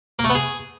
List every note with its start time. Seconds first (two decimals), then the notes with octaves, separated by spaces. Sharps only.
0.19 A#3
0.24 A3
0.30 B3
0.35 G#4